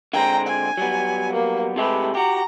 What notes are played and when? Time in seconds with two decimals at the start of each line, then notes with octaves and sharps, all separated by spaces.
0.13 D3 G#3 C4 G5 A#5
0.47 G#5
0.77 F#3 G3 B3
1.33 A#3
1.76 C3 G#3 A3 G4 B4
2.15 F#4 G4 A#5